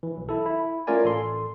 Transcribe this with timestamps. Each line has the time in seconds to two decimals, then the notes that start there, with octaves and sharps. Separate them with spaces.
0.03 E3
0.17 B1
0.29 E4 A4
0.46 E4
0.87 A3 C#4 F4 A#4 D5 G#5
1.04 A1 A4 C6